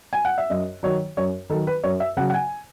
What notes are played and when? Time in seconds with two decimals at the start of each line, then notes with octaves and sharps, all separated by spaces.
0.13 G#5
0.25 F#5
0.38 E5
0.50 F#2 D#5
0.83 D#3 F#3 C#5
1.17 F#2 C#5
1.50 D#3 F#3 A4
1.67 B4
1.83 F#2 C#5
2.00 E5
2.17 C#3 F#3 F#5
2.30 F#5
2.34 G#5